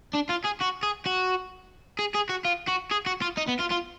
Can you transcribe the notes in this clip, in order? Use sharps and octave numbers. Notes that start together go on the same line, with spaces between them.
D4
F4
G#4
F#4
G#4
F#4
G#4
G#4
F#4
F4
F#4
G#4
F#4
F4
D#4
B3
F4
F4